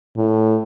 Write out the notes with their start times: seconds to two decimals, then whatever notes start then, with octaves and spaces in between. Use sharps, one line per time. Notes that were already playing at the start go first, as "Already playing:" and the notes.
0.17 A2